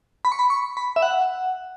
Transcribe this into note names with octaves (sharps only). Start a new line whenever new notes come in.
B5
C#6
B5
C#6
B5
E5
F#5